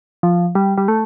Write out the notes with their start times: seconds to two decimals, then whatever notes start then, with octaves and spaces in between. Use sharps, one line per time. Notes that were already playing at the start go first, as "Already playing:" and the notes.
0.23 F3
0.55 G3
0.78 G3
0.88 A3